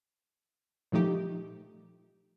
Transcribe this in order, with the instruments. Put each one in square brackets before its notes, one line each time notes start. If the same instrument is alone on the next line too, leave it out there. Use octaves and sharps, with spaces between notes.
[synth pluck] A#2 F3 A3 D#4 G4